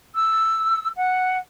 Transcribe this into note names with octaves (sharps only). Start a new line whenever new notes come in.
E6
F#5